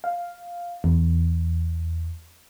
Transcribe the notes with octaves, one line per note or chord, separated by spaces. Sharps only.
F5
E2